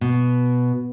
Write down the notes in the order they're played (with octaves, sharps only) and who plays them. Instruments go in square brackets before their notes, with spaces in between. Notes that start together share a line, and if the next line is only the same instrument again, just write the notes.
[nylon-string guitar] B2